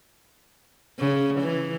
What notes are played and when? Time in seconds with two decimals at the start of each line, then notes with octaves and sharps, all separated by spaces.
0.99 C#3
1.41 E3